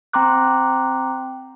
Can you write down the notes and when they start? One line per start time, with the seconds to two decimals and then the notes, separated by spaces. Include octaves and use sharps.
0.13 C4 G5 A#5 C6 D6 F#6